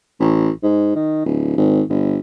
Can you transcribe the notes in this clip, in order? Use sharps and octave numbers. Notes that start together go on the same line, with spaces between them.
A1
G#2
D#3
D1
G#1
G1